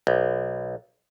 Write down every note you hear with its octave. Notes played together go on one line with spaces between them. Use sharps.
B1